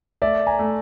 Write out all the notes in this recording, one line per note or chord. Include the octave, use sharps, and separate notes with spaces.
A3 D5 E5
G#5 A#5
A3